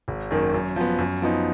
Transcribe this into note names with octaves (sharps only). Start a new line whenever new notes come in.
G#1
F#2 D#3 A#3
F#2
F3 B3
F#2
F3 B3 D#4